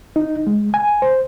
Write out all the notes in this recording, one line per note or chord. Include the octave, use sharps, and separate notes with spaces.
D#4
G#3
G#5
C5